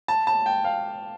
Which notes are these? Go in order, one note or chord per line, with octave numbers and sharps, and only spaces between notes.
A5
A5
G5
F5